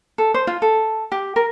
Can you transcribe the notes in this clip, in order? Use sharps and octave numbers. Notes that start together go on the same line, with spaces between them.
A4
C5
F4
A4
G4
A#4